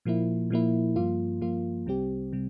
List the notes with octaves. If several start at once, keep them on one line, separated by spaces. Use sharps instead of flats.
A#2 F3 A#3 E4
A#2 F3 A#3 E4
G2 F3 A#3 F4
G2 F3 A#3 F4
C2 C3 G3 C4 G4
C3 G3